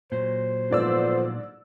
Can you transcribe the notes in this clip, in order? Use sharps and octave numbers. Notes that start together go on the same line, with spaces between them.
A#2 F#3 C5
G#2 D3 F3 B3 D5 E6